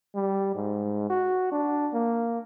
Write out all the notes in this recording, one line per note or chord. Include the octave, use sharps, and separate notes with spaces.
G3
G#2
F#4
D4
A#3